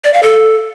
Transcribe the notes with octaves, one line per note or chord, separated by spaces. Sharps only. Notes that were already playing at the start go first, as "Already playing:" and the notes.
D5
F5
A4